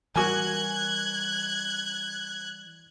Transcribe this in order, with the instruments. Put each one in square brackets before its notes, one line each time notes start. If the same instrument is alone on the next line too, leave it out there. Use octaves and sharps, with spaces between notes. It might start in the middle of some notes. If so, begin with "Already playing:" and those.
[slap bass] E3 G3 [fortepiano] F#4 A#4 G#5 [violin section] F#6 G#6